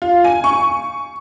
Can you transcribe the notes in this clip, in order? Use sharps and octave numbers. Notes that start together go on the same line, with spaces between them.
F4
G#5
C#6